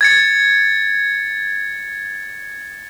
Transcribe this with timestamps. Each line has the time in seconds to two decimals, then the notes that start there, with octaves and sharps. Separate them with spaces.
0.01 G#6 A6 C#7